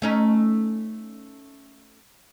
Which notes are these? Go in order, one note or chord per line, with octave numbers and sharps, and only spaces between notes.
A3 C#4 D#4